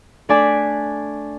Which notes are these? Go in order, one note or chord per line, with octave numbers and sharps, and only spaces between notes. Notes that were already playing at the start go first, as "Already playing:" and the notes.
A3 D4 D5 G#5 A5 B6